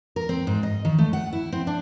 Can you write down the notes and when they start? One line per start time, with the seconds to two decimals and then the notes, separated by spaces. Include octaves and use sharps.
0.16 A#4
0.29 C4
0.47 G#2
0.63 D#5
0.85 D#3
0.98 A3
1.13 F#5
1.33 E4
1.52 C4
1.67 D4